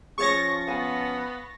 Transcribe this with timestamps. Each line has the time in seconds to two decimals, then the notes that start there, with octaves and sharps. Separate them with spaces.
0.18 F3 C#4 G#4 C5 C#5 C#6 A6 A#6
0.67 B3 C5 F5 G#5